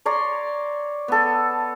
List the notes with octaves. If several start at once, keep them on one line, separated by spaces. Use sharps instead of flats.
C#5 D5 A#5 C6
B3 A4